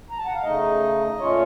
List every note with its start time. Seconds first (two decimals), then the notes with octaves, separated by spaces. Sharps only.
0.10 A#5
0.18 A5
0.25 F#5
0.34 F5
0.42 C#3 A3 D#4 D#5
1.19 A#2 A3 C#4 F4 C#5